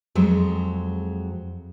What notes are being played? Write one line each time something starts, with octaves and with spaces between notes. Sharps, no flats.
F2 F#3 G#3